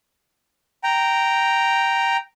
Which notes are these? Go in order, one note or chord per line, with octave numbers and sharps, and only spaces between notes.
G5 A#5